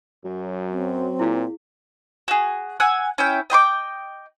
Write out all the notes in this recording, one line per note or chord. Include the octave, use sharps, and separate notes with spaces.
F#2 F#3
C4
A#2 E4 G#4 F5
F#4 G#4
F#5 G#5 E6 F#6
C#4 E4 G5
D#5 G5 C6 D6